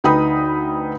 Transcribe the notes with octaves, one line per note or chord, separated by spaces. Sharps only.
D2 D#4 B4 G5 B5 D#6